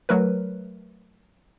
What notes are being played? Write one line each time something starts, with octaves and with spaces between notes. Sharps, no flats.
F#3 A3 A#4 B4